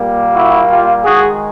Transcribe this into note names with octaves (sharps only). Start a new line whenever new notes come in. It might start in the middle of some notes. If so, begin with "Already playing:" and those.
Already playing: A#2 G3 A#3
E4 F#4
F4 G4
D#3 G#3 F#4 G#4